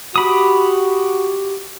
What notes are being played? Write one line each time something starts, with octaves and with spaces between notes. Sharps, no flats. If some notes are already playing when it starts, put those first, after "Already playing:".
F#4 G4 B5 D#6